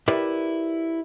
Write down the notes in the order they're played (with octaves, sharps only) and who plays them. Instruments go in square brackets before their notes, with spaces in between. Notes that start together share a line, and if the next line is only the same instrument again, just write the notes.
[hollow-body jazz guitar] E4 G4 A#4 B4 D5 E5